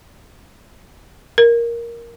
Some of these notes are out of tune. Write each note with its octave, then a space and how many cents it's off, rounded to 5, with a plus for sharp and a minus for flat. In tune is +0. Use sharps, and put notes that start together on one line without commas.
A#4 +5